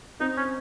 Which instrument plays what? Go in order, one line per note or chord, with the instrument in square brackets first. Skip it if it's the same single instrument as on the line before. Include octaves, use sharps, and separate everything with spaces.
[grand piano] C4 [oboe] D#4
[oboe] C#4